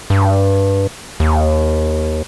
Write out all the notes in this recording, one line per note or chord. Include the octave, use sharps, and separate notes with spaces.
G2
D#2